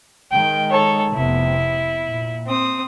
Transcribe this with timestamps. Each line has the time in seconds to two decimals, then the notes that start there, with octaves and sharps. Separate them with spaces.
0.31 D#3 G#3 G5
0.71 A4 C#5
1.14 F1 C3 B3 E4
2.06 A#2
2.46 C4 D#6